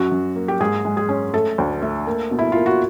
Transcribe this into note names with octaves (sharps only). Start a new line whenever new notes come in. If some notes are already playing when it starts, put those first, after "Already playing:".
Already playing: F#2 F#4
F#2
A#3
G4
G#2 G#4
G#3
G#4
C#4
A3 A4
D2
A3
A#3
B2
E4
A#3 F4
F#4